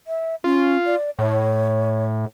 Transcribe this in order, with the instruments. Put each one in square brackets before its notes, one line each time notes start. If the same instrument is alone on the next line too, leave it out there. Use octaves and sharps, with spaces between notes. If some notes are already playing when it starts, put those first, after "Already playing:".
[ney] E5
[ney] C#4 [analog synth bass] F4
[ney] D5
[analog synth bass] A2 [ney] C#5